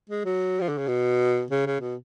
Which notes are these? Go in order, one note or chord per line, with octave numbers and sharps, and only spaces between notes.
G#3
F#3
F3
D3
C#3
B2
C#3
C#3
B2